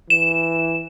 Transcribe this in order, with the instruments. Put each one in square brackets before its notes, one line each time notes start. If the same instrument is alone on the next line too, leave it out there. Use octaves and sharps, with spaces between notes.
[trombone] E3 [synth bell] E7